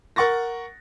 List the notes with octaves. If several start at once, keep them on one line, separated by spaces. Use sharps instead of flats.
A#4 F#5 C#6 A6 A#6